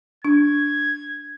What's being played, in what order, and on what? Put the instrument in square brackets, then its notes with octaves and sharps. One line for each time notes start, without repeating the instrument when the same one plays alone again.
[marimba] D4 [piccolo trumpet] G#6